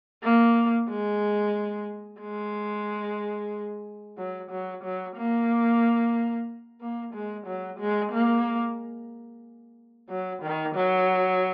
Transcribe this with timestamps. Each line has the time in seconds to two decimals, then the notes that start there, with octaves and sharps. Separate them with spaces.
0.23 A#3
0.89 G#3
2.21 G#3
4.18 F#3
4.51 F#3
4.84 F#3
5.17 A#3
6.81 A#3
7.14 G#3
7.47 F#3
7.79 G#3
8.12 A#3
10.09 F#3
10.43 D#3
10.75 F#3